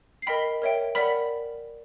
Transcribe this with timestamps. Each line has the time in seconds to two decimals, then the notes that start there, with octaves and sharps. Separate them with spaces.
0.22 C7
0.27 A#4 D#5 G5 B5 B6
0.62 A#4 C#5 E5 G5
0.95 A#4 D5 F#5 B5 B6